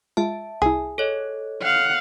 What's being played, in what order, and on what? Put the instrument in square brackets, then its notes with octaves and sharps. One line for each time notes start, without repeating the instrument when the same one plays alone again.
[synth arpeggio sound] G#3 F4 [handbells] E5 A5
[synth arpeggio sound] C2 E4 [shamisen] G#4
[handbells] A4 C#5 D#5
[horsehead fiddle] F5 F#5